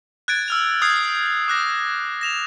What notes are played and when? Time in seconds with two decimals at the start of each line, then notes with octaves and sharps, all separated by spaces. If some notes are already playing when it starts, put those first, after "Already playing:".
0.28 F#6 G#6 A6 D7
0.48 E6 F6 F7
0.82 D#6 G6 G#6 C7
1.48 D6 F#6 A#6
2.21 A#6 E7 F7